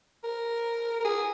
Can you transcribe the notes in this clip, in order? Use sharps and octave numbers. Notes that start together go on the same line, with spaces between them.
A#4
A#4
G#4